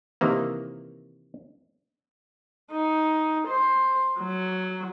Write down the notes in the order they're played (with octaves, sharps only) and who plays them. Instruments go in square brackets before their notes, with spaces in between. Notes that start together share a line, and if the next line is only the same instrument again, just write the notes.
[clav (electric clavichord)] C3 D#3 E3 A#3
[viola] D#4
C5
F#3